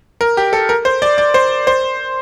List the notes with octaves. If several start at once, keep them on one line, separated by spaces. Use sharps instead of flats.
A#4
G4
A4
A#4
C5
D5
D5
C5
C5